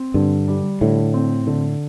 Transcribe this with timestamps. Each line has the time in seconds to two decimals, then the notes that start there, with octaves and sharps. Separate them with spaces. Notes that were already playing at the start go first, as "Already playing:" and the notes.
Already playing: C4
0.14 G2 D3
0.48 G3
0.81 A2 D3
1.14 C4
1.47 D3